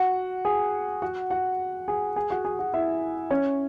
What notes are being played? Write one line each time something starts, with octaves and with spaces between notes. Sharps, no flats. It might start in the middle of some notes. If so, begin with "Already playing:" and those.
Already playing: F#4 F#5
G#4 G#5
F#4 F#5
F#4 F#5
G#4 G#5
G#4 G#5
F#4 F#5
G#4 G#5
F#4 F#5
E4 E5
C#4 C#5